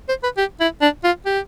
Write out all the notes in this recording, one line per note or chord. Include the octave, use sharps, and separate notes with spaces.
C5
B4
G4
E4
D4
F4
G4